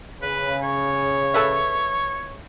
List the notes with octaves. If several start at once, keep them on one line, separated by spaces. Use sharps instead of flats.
C#3 B4
C#5
A4 B4 E5